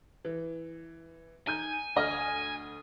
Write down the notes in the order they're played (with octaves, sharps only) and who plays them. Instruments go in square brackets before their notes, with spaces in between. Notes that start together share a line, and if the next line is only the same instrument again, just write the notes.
[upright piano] E3
[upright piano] D#4 G6 [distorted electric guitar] G#5
[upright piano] D2 D#5 F6